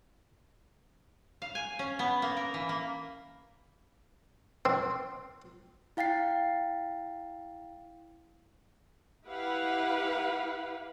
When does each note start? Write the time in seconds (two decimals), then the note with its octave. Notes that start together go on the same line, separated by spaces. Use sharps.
1.42 F5
1.55 G#5
1.79 C#4
1.99 B3
2.22 A#3
2.37 A#4
2.54 E3
2.69 A#3
4.65 C4
5.97 E4 F5 G5 A6 C7
9.28 E4 G4 B4 F5 F#5